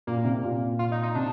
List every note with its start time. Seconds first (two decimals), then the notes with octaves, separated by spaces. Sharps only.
0.07 A#2 A#3
0.25 C3
0.43 A#2
0.79 F4
0.92 D#4
1.03 D#4
1.15 C3 D4